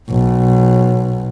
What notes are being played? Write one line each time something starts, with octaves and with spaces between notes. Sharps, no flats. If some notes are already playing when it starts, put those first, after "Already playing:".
B1